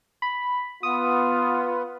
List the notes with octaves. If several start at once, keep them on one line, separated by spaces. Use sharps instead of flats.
B5
B3 F4 D#6